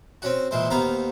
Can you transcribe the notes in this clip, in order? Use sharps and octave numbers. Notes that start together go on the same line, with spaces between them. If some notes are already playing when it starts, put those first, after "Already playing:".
C4 C#4 F#4
A#2 E3 G#3 C5
D#2 B3 C5 F5 A#5